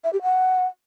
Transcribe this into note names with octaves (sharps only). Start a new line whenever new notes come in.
E5
G4
F#5